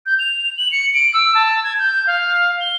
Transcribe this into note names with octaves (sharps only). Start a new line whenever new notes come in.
G6
F7
F#7
C#7
D7
E6
A5
G#6
G6
F5
G7